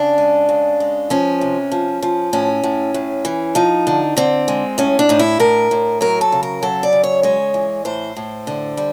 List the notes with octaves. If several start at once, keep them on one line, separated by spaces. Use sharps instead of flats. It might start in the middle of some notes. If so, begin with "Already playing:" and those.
Already playing: C#3 D4
G#3
C#3
G#3
F3 C#4
C3
F3
F3
A2 C#4
A2
A2
E3
F3 D#4
D3
D3 C4
G#3
A2 C#4
D4
A2 D#4
E4
A2 A#4
A2
F#3 A#4
A4
C#3
A#4
F#3 A4
D5
C#3
C#5
G#3 C#5
E3
A2 C5
A2
D3
G3